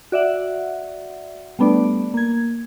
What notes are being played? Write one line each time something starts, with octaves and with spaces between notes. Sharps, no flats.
F#4 D5 E5 F#5
G3 A3 B3 D4 D5
A#3 G#6